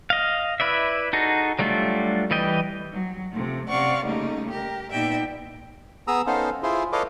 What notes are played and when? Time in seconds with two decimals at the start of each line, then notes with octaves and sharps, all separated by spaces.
0.10 D#5 F5
0.60 E4 B4 D5 E5
1.13 D#4 F#4 G#4 A4
1.59 F#3 G3 A3 D4 F4
2.31 E3 G3 D#5 G5
2.92 F#3
3.32 C3 F3 A3
3.68 C3 C#4 D5 F5 F#5 C#6
4.05 C#3 G3 A3 A#3 C#4 D#4
4.51 G4 A#4
4.91 A#2 B3 D#4 D5 E5 G5
6.07 B3 G#4 A#5 D#6 E6
6.27 B3 C#4 D#4 A4 C5 F5
6.63 E4 F4 G#4 C5
6.92 A4 B4 C#5 D#5 F5 D6